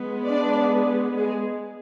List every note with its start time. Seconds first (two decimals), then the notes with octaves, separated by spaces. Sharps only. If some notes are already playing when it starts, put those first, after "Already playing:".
Already playing: G#3 B3
0.26 D4 D5
1.16 G#3 G#4